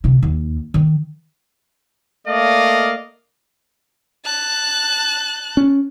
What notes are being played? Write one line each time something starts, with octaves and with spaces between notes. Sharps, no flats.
C3 E4
D#2
D#3
A3 A#3 D5 D#5 F5
A5 F#6
C#4